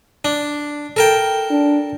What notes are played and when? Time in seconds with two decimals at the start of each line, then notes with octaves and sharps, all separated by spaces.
0.25 D4
0.96 A4 A#4 G5
1.50 D4